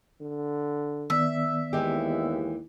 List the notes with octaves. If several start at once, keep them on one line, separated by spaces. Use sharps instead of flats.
D3
D#3 B3 D5 E5
D#2 E3 G#3 G4